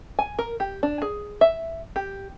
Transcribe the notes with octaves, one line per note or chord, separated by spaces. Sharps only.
G#5
A#4
G4
D4
G#4
E5
G4